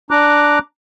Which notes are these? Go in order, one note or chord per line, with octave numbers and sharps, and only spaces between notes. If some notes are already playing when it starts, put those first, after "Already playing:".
D4 A#5 D6 F#6